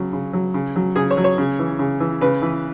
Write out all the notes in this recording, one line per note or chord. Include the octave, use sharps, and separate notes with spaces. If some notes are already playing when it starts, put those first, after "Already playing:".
Already playing: C#3 F#3
C#3
F#3
C#3
F#3
C#3 G#4
C#5
F#3
C#5
C#3
E3
C#3
E3
C#3 B4
E3